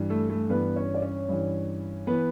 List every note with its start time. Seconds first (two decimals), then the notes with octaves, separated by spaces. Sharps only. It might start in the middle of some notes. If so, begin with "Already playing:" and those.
Already playing: G2 E3
0.10 A3 A4
0.30 A3 A4
0.50 G2 E3 B3 B4
0.76 C#4 C#5
0.94 D5
1.02 C#4 C#5
1.29 G2 E3
2.07 E3 B3 B4